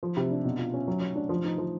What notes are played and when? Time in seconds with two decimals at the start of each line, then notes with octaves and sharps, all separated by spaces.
0.03 F3
0.17 C3
0.31 D4
0.45 B2
0.59 F4
0.74 C#4
0.88 F#3
1.01 F#3
1.15 D4
1.29 F3
1.45 D#4
1.58 F3